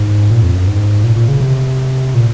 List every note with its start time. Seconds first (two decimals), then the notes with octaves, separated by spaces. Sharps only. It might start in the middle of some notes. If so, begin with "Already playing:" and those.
Already playing: G#2
0.30 A#2
0.42 F2
0.55 F#2
0.68 G#2
1.03 A#2
1.16 A#2
1.28 C#3
1.40 C3
2.14 A#2